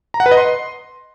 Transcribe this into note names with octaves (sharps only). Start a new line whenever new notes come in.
A#5
F#5
B4
D#5
C6